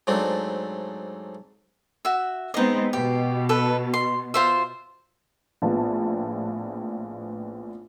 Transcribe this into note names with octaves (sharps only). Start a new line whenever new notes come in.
G#2 F#3 A3 C4 D4
F#4 E5
G#3 B3 C4 D#4 D#5
B2 G4
A4 B4
C6
F4 C5 E5
A#1 A2 B3 F4 A5